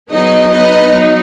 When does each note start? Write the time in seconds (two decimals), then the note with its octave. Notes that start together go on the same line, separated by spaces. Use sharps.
0.10 F#3 B3 D#4 G#4 D#5
0.51 B3 D#4 B4 D#5
0.91 F#3 D#4